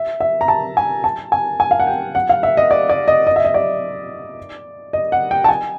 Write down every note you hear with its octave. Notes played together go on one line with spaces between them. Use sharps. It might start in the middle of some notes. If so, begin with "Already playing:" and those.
Already playing: E5
E5
A#5
A5
G#5
A5
G#5
G#5
F5
F#5
G5
F#5
F5
E5
D#5
D5
D5
D#5
D#5
E5
D#5
D5
D#5
F#5
G5
A5
G#5